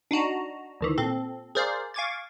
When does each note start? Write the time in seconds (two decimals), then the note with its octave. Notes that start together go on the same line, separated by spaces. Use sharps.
0.11 D4 D#4 F#4 A#5
0.81 D2 D#3 E3
0.98 A#2 C4 A4
1.55 G#4 A#4 C5 D5 F5
1.94 F5 G#5 C#6 D6 G#6 A6